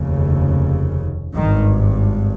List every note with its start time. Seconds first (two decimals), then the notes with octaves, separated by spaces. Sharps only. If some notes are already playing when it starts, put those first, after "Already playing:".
Already playing: F1 D#2 C#3
1.34 G#1 G2 D#3